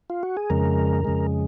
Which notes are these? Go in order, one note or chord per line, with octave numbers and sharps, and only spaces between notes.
F4
F#4
G#4
F2 C#3 G#3 A#4
F2 C#3 G#3